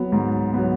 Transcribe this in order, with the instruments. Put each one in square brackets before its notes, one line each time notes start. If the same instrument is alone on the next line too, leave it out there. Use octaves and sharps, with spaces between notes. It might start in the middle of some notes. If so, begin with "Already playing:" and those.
Already playing: [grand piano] F#3 B3
G#2
F#3 B3